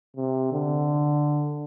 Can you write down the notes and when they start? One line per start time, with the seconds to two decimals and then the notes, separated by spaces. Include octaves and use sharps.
0.17 C3
0.53 D3